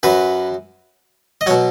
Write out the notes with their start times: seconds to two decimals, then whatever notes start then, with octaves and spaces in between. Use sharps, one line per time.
0.03 F#2 F#3 B4
1.41 D#5
1.46 F#3 C#5
1.50 B2